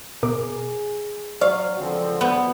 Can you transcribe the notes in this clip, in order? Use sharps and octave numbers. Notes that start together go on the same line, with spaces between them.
B2 G#4 A#4 D6
F#3 C5 D5 F5 C#6
C#2 D3 F3 C4
F#3 B3 F#6 G6